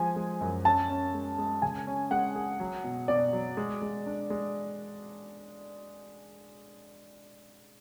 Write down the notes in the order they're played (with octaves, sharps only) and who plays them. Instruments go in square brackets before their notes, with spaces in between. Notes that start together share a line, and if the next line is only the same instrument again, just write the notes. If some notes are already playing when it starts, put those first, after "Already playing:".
Already playing: [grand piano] F3 G#3 [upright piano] G#5
[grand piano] G#3
F#2
[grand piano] C#4 [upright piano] A5
[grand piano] C#4
G#3
G#3
[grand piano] C#3 [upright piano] G#5
[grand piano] C#4
[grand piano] G#3 [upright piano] F#5
[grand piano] G#4
F#3
B2
[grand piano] B2 [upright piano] D5
[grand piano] F#3
G#3
G#3
D4
G#3